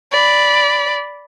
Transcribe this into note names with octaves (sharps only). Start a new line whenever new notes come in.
D5 B5